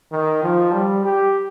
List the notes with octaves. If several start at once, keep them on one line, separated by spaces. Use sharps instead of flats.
D#3
F3
G3
G4